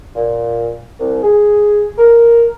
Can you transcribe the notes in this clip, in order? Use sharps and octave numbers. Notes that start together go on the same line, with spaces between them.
A#2
C2
G#4
A#4